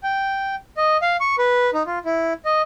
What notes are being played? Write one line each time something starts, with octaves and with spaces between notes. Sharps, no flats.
G5
D#5
F5
C#6
B4
D#4
F4
E4
D#5